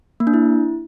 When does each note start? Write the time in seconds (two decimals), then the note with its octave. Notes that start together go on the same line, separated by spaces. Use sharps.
0.20 A#3
0.27 D4
0.34 E4